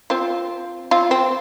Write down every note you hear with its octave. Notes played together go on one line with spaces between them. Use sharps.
C4 F4
C4 F4
C4